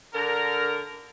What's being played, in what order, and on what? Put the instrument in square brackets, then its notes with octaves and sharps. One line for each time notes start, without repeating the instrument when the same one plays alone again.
[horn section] D3 A#4